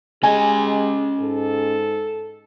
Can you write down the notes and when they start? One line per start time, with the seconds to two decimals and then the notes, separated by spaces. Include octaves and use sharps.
0.23 G#3 C#4 G4 D#5 G#5
1.20 G#2 A4